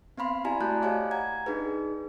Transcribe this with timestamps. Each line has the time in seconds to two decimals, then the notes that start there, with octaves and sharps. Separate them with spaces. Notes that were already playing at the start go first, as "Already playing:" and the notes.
0.18 B3 C4 F5 B5 C6
0.44 E4 G4 D5 G#5 A#5 B5
0.60 A3 F#4 D5 A5 F#6 G6
0.82 G4 C#5 D#5 F5 G#5 D6
1.11 F#5 A#5 G#6
1.46 D4 D#4 G#4 B4